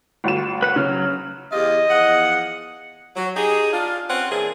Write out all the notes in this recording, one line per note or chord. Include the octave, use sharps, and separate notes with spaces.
G1 D2 E7
B4 F#5
C#3 F#3 F6
E2 F4 G4 D#5
E2 F3 F#5
F#3
D#4 G4 G#4
D4 F4
C4 C#4 B4 C#5 F#5
A#2 E3 D4 G#4